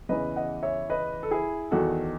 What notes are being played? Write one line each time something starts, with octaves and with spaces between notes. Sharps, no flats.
E2 C#3 E3 B4 D#5
D#5 F#5
C#5 E5
B4 D#5
A4
E4 G#4
E2 D#3 F#4 A4